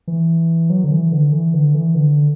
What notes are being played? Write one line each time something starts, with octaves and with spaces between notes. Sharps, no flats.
E3
F#3
D3
E3
D3
E3
D3
E3
D3